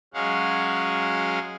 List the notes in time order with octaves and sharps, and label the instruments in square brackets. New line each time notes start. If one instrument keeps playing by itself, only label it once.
[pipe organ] F#3 G#3 C#4 F5 F#5